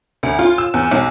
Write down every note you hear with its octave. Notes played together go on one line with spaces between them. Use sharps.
D2
F4
E6
E2
B1